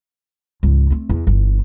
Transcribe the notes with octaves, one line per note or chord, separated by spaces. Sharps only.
C#2 G#2
A3 C4
E2
G1 E3